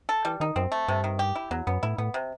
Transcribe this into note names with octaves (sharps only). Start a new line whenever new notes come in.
A4
E3 G3
D#3 D#4
F#2 C4
A3
G2 C3
D#3
G4
E4
E2 F#3
F#2 B3
A2 E4
A2 B3
C3